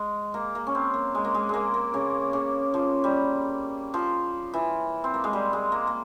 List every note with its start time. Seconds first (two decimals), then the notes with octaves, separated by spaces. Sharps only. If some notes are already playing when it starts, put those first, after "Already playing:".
Already playing: G#3
0.34 A#3
0.55 A#3
0.67 C#4
0.75 C4
0.94 A#3
1.15 G#3
1.24 A#3
1.34 G#3
1.49 G#3 A#3
1.74 A#3
1.94 C#3
2.33 C#3
2.74 F3
3.04 G3
3.94 F3
4.54 E3
5.04 C4
5.14 A#3
5.24 G#3
5.33 G3
5.53 G#3
5.72 A#3
5.87 A#3